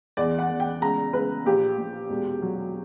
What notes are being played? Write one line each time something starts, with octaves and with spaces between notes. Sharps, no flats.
E2 D5
F#5
E2
G5
C#2 A#5
C#2 B4
A#1 G4
A#1
E1
F#3